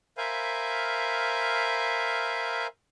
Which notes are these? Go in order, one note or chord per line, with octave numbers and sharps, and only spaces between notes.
A#4 C5 E5 F5 G#5 B5